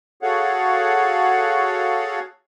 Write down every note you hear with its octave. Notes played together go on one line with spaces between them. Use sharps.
F#4 G#4 A4 C#5 F5 F#5